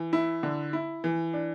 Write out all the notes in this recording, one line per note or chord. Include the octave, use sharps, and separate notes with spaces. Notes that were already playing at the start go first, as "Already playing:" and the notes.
Already playing: E3
E4
D3
E4
E3
D4